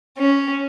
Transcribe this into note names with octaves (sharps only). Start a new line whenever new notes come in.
C#4